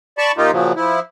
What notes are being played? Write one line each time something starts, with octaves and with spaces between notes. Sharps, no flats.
D5 A5 B5 C#6
A#2 A#3 D#4 F4 G4
A#2 C#3 F3 F#3
F3 E4